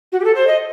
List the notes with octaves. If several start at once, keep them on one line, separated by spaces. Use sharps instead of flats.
F#4
G4
A4
C5
D#5